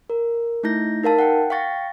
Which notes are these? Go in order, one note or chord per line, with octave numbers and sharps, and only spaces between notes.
A#4
A3 D#4 E4 G6 A#6
D#4 A#4 F5 A5
F#5 G5
F5 G5 C#6 A6 A#6